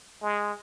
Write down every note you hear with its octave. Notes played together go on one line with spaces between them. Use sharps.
G#3